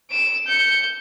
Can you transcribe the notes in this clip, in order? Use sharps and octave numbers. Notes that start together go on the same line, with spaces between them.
D7 E7
G6 C#7